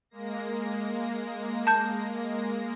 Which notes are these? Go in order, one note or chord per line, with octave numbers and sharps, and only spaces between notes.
G#3 A#3 A#6
A5 G6